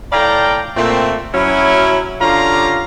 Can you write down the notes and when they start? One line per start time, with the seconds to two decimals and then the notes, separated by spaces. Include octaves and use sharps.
0.12 A2 D5 F5 G5 A5 A#5
0.77 A#2 A3 C4
1.34 F#3 C#4 E4
2.21 D3 C#4 F4 G4 F5 A#5